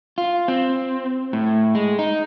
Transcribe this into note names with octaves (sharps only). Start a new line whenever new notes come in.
F4
C4
A2
G#3
D#4